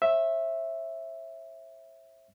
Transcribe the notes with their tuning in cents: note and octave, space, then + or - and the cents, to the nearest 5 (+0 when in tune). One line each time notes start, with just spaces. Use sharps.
C#5 -45 E5 +0